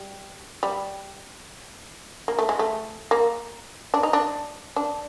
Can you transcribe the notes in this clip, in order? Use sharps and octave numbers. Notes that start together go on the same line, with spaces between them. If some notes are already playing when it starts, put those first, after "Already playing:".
Already playing: G3
G3
A#3
A3
G#3
A3
A#3
D4
D#4
D4
D4